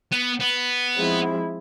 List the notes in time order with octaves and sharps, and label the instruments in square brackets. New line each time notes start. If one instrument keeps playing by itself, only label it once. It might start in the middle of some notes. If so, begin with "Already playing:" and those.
[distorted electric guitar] B3
B3
[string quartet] F3 G#3 C4 E4